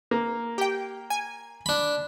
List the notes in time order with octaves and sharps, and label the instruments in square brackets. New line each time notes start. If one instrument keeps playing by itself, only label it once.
[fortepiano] A#3
[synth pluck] G4 G5
G#5
[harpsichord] D4 B5